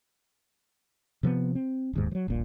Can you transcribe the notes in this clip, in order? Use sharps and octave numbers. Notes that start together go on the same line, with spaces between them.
C3 F3 G#3 B3
C4
D1 D#2 G#2
F3 F#3
D#1 A#1 A#2